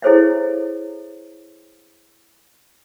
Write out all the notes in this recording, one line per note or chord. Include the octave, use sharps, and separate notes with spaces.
E4 G#4 A4 C5 C#5 E5